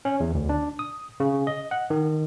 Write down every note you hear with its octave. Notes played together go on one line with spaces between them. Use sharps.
C#4
E2
D2
D4
D#6
C#3
D#5
F#5
D#3